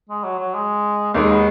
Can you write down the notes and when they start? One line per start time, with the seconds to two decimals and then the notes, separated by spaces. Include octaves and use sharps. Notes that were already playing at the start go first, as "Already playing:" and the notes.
0.09 G#3
0.24 F#3
0.39 F#3
0.54 G#3
1.14 D#2 D#3 G#3 A#3
1.30 B3